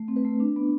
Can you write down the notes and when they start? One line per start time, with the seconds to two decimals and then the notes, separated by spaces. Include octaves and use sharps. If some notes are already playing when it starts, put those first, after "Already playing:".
Already playing: A3
0.08 C4
0.16 B4
0.24 A3
0.40 D4
0.56 B3